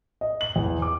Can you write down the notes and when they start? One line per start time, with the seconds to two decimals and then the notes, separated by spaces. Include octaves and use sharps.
0.21 D#5
0.41 F#7
0.56 E2
0.82 D6